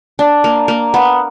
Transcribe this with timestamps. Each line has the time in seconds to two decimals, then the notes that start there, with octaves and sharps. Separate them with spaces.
0.19 D4
0.44 A#3
0.68 A#3
0.94 B3